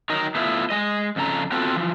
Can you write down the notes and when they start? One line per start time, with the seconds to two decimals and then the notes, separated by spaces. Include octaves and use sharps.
0.09 F#3 D#4 A#4
0.35 A3 B3 E4 F4
0.70 G#3 D#5
1.16 F2 C#3 A4 A#5
1.52 B3 C4 F4 F#4 A4
1.75 E3 F3